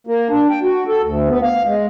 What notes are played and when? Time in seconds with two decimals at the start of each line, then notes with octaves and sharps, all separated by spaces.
0.07 A#3
0.30 D4
0.50 G5
0.63 F#4
0.88 A4
1.03 D2
1.29 B3
1.43 F5
1.66 G#3